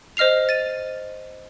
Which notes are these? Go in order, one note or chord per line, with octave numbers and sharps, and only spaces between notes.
C5 D#5 F6 C7 F7
A6 D#7